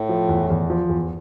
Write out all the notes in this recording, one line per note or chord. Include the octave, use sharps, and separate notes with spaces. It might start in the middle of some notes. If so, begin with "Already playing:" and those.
Already playing: A2
F3
E2
E2
F3
E2